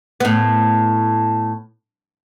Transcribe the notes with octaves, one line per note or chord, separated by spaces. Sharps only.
A2 B3